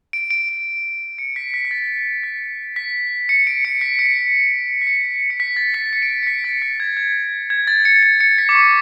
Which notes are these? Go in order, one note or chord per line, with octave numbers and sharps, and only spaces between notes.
D7
D7
D7
C#7
B6
B6
B6
A6
B6
B6
C#7
D7
C#7
B6
C#7
B6
C#7
C#7
B6
A6
B6
C#7
D7
C#7
C#7
B6
A6
B6
G#6
G#6
G#6
A6
C#7
C#7
C#7
B6
D6
C#6